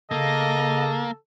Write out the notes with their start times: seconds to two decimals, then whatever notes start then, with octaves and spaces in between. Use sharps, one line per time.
0.11 C#3 A#3 A4 D#5